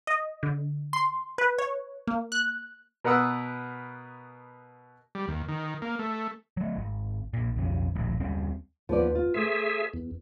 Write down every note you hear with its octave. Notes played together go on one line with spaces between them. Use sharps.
D#5
D3
C6
B4
C#5
A#3
F#6
B2 A#4 B4 F#5 D#6 E6
G3
D#2
D#3
A#3
A3
F#3 A3
G#1
A#1 A#2
B1 F2 C#3
D#1 A#1 A2
D#2 G3 C4 C#4
D#2 F3 B3 D5
F4
A3 G#4 C5 E5
E2